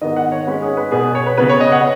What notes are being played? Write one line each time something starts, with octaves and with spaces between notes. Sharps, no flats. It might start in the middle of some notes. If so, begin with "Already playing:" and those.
G#2 D#3 B3 D#5
F#5
C#5
G#2 G#3 C#4 B4
G#4
B4
B2 B3 G#4
C#5
B4
C#3 B3 B4
C#5
D#5
F#5